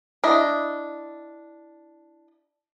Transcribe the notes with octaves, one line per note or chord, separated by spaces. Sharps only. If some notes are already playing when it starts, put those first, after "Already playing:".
D4 E4 D#5